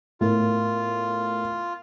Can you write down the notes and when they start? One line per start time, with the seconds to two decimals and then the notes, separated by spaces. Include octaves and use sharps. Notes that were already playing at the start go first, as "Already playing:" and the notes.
0.21 A2 B3 F4 A#4